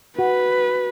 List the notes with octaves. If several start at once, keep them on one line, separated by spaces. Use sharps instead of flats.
F#4 B4